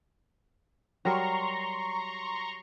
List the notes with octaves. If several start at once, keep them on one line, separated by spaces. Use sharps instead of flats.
F#3 G3 A#4 A#5 C6 C#6